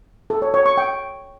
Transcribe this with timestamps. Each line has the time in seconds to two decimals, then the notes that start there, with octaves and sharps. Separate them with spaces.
0.30 A4
0.42 C#5
0.54 C#5
0.66 C#6
0.78 G5